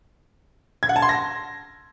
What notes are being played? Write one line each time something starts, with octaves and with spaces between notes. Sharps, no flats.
G#6
F#5
A5
C6
A#6